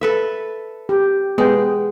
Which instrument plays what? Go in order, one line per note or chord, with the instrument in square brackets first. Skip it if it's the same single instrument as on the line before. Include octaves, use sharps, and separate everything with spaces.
[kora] A4 B4 E5
[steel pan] G4
[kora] G#3 [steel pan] B3 G5